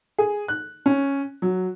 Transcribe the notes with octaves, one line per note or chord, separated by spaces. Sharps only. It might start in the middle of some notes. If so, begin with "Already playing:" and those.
G#4
F#6
C#4
F#3